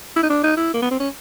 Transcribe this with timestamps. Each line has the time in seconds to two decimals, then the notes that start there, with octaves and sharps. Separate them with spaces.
0.16 E4
0.23 D#4
0.30 D4
0.44 D#4
0.57 E4
0.74 A#3
0.82 B3
0.91 C4
1.00 C#4